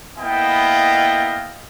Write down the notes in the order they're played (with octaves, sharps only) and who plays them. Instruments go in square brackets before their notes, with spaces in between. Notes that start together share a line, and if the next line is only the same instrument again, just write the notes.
[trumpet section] A#3 B3 E4 D#5 F5 G5